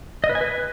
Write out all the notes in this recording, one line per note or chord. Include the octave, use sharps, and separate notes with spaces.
D#5
B4
G#5
B4